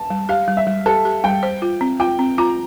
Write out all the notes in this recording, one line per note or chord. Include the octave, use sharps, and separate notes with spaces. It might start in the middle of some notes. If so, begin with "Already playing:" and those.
Already playing: A5
G3
G4 F5
G3
E5
G3
G4 A4
G4
G3 G5
C5
F4
C4
F4 G5
C4
F4 A#5